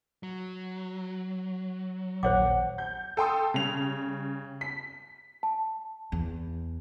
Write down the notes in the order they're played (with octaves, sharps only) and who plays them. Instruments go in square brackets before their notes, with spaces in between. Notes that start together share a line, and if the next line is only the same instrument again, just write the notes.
[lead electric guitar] F#3
[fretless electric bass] A#1 D#2 [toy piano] C5 C#5 D6 [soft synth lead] F#5
[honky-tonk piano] G6
A4 G5 C6 D#6
C#3 G3 F7
B6
[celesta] A5
[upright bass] E2